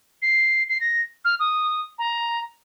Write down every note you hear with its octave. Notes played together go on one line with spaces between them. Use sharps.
C7
C7
A#6
F6
D#6
A#5